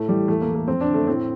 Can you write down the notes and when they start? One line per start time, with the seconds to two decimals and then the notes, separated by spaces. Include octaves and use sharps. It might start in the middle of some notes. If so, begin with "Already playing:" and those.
Already playing: A2 A3
0.08 E3 G3
0.28 E2 A3
0.41 A#3
0.48 E3
0.55 A3
0.68 F2 C4
0.81 D4
0.88 D3
0.94 A3
1.07 A2 C4